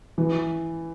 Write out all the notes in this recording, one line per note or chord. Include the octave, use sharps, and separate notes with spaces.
E3